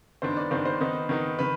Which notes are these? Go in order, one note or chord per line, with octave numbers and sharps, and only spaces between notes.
G2 D#3 B3 D4 C5
D5
G2 D#3 B3 D4 C5
C5
D#3 B3 D#4
D#3 B3 D#4
D#3 B4